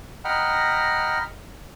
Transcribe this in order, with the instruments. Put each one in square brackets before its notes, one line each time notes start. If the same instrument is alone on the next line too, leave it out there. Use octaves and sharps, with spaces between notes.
[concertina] D#5 F#5 G5 A#5 B5 F6